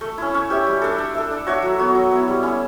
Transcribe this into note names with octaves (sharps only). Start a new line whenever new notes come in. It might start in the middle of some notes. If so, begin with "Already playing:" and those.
A3
C#4 E4
C#4
G4 C#5 E5
G3
D4 A4
D4
A4 E5
D4
F#4 C#5 E5
F#3
B3 F#4 C#5
F#3
B3 E4
G3
C#4 E4